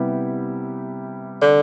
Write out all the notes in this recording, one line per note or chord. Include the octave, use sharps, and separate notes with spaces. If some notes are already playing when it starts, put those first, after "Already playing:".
Already playing: C3 G3 B3 E4 G4
D3